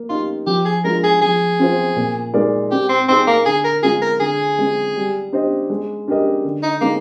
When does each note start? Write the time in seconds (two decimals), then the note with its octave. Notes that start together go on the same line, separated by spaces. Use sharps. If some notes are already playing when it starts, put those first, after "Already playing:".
Already playing: A#3
0.09 D#4 F4 G4
0.47 F3 G4
0.65 G#4
0.84 G#3 D4 F4 A#4
1.04 G#4
1.22 F3 G#4
1.60 C4 F4 C5
1.96 A#2
2.34 G#3 D#4 A#4 D5
2.71 C4 G4
2.89 C4
3.08 C4 D#4 G#4
3.27 A#3
3.46 D3 G#4
3.65 A#4
3.83 G#3 C4 F4 G#4
4.02 A#4
4.20 D3 G#4
4.58 G#3 C4
4.96 G3
5.33 D4 G4 C5 D#5
5.70 G#3
6.08 D4 G4 A#4 D#5
6.45 D3
6.63 D#4
6.81 G#3 A#3 C4 D#4